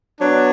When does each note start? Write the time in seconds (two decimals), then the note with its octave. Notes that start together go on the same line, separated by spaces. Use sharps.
0.19 F#3 B3 D4